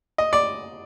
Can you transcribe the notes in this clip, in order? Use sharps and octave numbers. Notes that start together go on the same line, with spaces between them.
D#5
D5